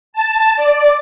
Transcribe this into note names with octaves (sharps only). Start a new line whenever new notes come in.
A5
D5